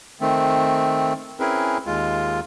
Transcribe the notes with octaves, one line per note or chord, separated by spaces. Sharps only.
D#3 A3 C4
C4 C#4 E4 G#4 A#4 B4
D#2 G#3 F4